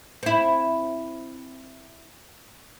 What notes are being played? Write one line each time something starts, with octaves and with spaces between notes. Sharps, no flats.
C4 E4